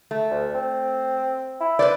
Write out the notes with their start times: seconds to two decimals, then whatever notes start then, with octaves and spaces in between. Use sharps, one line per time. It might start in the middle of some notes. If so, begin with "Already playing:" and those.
0.11 A3
0.30 D2
0.54 C4
1.60 E4
1.79 B4 C5 D5